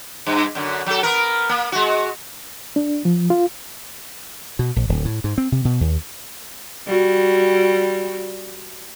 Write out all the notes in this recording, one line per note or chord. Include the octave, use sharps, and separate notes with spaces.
G2
F#2 D3
F#3 A4
B3 A#4
A#3
G#3 F#4
D4
F3
F4
B2
A#1
D1
A2
G#2
C4
C3
B2
D#2
G3 F#4